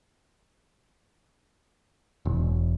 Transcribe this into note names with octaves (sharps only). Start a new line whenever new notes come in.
E1